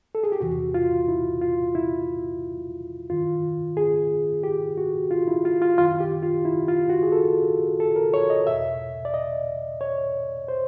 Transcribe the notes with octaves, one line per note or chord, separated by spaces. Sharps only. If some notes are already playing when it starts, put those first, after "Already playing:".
A4
G#4
G4
E2 C3 E3 F#4
F4
E4
F4
E4
F#2 D#3 F4
G#4
G4
F#4
F4
E4
F4
F4
F#2 D#3 F4
G4
F4
E4
F4
F#4
G#4
A4
A4
A#4
C#5
D#5
E2 B2 E5
D5
D#5
C#5
C5